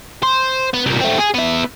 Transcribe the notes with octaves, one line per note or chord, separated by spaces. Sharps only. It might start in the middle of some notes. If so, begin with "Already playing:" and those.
C5
B3
C2 A#2
A3 C4
G#4
B3 E5